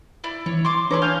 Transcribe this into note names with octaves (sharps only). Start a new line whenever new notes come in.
E4 D5
E3 C#5
C6 D6
D4 G#4 A4 B4 C#5 A#5
F5 G#5 F6 G6